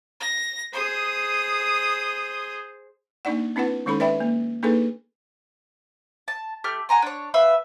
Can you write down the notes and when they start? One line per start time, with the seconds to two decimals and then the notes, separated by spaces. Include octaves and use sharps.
0.20 A#6
0.73 G#4 C5 D#6
3.25 A#3 D4 D#4 D5 F#5
3.56 C4 D4 E4 B4 F#5
3.86 D#3 G#3 C#4 D#4 A4 B5
4.00 B4 D5 E5 G5 B5
4.20 A#3
4.63 A#3 D4 D#4 G#4 A4 B4
6.28 A5
6.64 A3 G4 F6
6.89 F#5 G#5 A#5 C6
7.02 D4 C#5
7.34 B4 E5 F5 B5